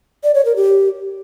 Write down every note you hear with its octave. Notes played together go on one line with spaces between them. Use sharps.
D5
C#5
A#4
G4